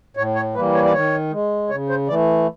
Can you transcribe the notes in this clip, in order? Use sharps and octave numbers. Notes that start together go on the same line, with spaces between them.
A2 C#5
C#5
E3 G3 A#3 B4
C#5
D5
D#3 C#5
G#3
C#3 C#5
C5
E3 A3 D5